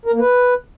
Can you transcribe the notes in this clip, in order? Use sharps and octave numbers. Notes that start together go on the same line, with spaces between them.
A#4
A#3
B4